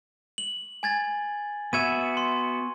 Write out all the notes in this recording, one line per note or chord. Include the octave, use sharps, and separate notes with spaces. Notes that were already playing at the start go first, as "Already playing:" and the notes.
F#7
G#5 G#6 A6
B3 F#4 E5 G#6 D#7
C6